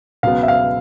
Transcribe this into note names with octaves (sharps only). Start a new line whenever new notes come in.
C#2 B2 F#3 B3 F5
E5
F5